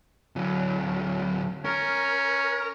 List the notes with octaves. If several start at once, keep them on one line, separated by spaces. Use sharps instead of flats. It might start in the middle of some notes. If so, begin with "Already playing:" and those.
D2 F#3
C#4 A#4